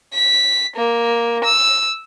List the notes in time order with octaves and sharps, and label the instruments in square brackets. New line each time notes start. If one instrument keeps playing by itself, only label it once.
[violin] B6
A#3
E6